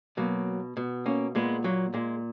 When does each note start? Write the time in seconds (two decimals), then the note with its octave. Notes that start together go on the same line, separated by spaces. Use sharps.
0.17 B2 F#3 A#3
0.77 B2
1.06 A#3 C#4
1.35 A#2 G#3 B3
1.64 F#3 A#3
1.94 A#2 G#3